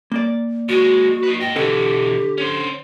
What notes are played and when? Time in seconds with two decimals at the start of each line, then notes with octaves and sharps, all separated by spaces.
0.12 A#3 D5
0.69 D#2 G#3 F#4
1.23 D#4 B4
1.40 G#2 D#5 G5
1.56 B2 D3 E3 G4 A4
2.38 C#4 C5